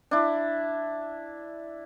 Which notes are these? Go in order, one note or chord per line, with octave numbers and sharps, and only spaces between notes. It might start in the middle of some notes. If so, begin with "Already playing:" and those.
D4 E4